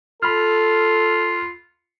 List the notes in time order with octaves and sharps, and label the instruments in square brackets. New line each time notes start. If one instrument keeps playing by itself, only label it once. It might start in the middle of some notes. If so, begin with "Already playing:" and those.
[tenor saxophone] F4 [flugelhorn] A4 [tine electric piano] B5 F6